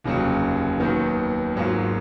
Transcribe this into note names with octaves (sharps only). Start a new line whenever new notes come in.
F1 D#2 C#3 F#3
D#2 D#3 F#3 B3
G#1 G#2 F#3 A#3 F4